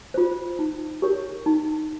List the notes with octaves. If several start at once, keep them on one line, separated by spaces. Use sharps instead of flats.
F4 C5
D#4
G4 A#4 C#5
D#4